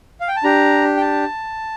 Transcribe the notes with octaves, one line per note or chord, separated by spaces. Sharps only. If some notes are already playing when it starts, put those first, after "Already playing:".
F5
G5
A5
D4 G4 A#5
G5
A5